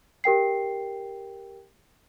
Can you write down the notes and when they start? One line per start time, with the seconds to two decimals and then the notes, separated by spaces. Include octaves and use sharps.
0.24 G4 A#4 G5 C7